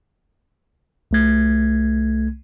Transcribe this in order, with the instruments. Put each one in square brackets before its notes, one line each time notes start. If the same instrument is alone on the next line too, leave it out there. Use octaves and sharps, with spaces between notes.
[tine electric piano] C2 A3 G#6